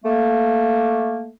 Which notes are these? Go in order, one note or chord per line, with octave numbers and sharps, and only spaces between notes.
A3 A#3